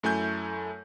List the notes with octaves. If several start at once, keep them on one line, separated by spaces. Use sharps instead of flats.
F#2 A3 E4 G#5 G6